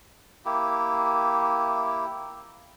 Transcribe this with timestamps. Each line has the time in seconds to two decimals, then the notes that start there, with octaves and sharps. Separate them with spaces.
0.45 A#3 E4 G4